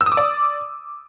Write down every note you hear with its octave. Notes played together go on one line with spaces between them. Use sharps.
E6
D#6
D6
D5